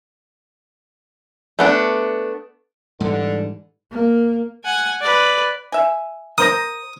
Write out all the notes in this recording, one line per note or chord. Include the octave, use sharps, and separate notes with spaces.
A3 B3 D4
G#2 D3 E3 G3
A#3
F#5 G#5
B4 D5
E5 G#5
A#4 C5 A#5 D#6